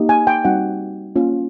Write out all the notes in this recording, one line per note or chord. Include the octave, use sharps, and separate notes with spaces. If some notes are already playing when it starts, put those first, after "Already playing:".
Already playing: A#3 D#4 G4
G#5
G5
G3 C4 D#4 F#4 F#5
A#3 C#4 F4